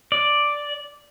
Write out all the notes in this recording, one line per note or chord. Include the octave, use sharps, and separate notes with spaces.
D5